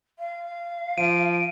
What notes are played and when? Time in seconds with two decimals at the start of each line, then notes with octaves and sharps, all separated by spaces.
0.19 F5
0.98 F3 D7 D#7